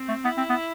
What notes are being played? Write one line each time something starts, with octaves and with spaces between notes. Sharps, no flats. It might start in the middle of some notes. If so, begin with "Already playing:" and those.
Already playing: C4
A3
B3 E4
C4
B3